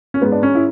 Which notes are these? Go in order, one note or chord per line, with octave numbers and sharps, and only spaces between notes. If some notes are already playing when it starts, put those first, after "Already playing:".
C#4
G#2 G#3 B3
D4
C#4
E4